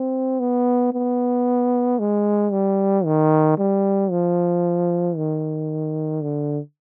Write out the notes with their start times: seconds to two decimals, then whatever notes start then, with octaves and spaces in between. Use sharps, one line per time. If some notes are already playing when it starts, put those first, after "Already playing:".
Already playing: C4
0.40 B3
0.93 B3
1.99 G#3
2.52 G3
3.05 D#3
3.58 G3
4.11 F3
5.17 D#3
6.23 D3